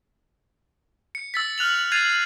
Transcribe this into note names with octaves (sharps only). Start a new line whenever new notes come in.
C#7
E6 A6 B6
F6 F#6 F7 F#7
F#6 G#6 A6 C7 D#7 F7